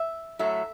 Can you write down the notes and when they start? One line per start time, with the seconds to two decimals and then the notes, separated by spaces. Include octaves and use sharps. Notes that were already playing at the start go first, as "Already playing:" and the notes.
Already playing: E5
0.39 A2 F#3 A3 E5